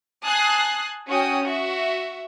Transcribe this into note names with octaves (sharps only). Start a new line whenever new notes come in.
G#5 A5 D#6 F#6 C7
C#4 F#4 G5 D#6
F#4 E5